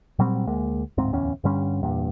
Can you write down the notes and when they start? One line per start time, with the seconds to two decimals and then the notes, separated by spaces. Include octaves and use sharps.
0.19 A#2 F#3 G3 C4
0.47 D2 G#3 A#3
0.98 D1 G#2 C4
1.13 D1 E2 C#4
1.44 G2 D3 G3 C#4
1.83 E2 G2 A#2